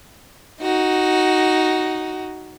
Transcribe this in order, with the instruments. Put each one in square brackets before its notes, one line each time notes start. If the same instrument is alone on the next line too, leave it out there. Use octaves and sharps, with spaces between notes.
[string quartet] D#4 F#4